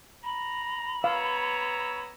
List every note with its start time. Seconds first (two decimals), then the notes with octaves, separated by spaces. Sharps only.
0.24 A#5 B5
1.04 B3 C#5 F5 A#5 E6